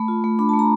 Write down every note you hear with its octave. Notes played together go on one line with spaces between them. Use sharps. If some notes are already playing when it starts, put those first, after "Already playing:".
Already playing: A3 B5
F4
A3
D4 B5
A5
A3
A#5